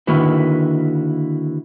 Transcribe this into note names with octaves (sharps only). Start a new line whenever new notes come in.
D3 D#3 A#3 E4 F#4 B4